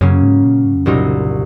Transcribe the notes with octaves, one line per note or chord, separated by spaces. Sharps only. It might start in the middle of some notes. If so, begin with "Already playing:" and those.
F#2 C#3 F#3 A#3 C#4
G#2
A#2
G#2
F2
C2 F#2 A#2 F#3 C4 D#4